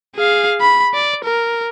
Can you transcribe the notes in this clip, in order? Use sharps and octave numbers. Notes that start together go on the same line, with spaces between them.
G#4 F5
B5
D5
A#4